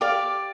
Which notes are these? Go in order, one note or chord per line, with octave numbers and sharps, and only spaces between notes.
G4 D5 F5